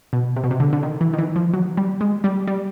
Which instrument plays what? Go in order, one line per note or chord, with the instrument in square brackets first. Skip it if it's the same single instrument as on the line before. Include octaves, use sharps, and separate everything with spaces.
[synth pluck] B2
C3
B2
C3
D3
D3
D#3
E3
D#3
E3
F3
F#3
G3
G#3
G3
G3